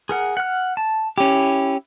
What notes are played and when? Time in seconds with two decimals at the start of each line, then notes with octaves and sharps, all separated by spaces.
0.09 G#4 A#4 F#5
0.37 F#5 F6
0.77 A5
1.18 C#4 E4 G4